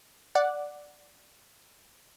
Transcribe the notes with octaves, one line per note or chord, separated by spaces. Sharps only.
D5 F#5